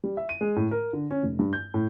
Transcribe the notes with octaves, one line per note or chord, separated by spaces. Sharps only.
G3
E5
D#7
G#3
A2
A#4
D3
C#4
F1
G2
G6
A2